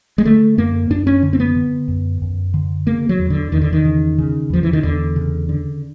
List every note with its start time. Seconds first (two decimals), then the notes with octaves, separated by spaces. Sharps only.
0.18 G#3
0.25 D3 A3
0.58 F#2 A#3
0.90 F#2 D4
1.07 C#4
1.23 D3
1.33 C4
1.40 B3
1.56 D3
1.88 F#2
2.22 F#2
2.54 D3
2.86 C#3 A#3
3.09 F#3
3.19 E2
3.30 D3
3.52 E2 D#3
3.62 D3
3.73 D#3
3.85 C#3
4.18 C#3
4.50 E2 F3
4.63 E3
4.73 D#3
4.83 E2 D3
5.16 C#3
5.49 D3